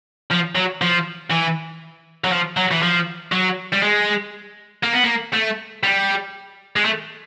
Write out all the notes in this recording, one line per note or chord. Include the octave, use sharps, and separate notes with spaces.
F3
F#3
F3
E3
F#3
F3
F#3
E3
F3
F#3
G3
G#3
A#3
B3
A#3
A3
G3
G#3
A3